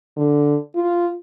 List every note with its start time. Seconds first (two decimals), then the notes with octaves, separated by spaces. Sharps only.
0.17 D3
0.75 F4